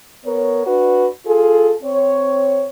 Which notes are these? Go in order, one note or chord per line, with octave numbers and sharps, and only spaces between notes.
B3 A#4 C#5
D4 F#4 B4
F4 G#4 A4
C4 C#5